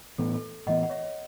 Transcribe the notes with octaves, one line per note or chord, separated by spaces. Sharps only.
A2 E3 B3 A4
A4
A2 E3 B3 D#5 F#5
F#5
C#5 E5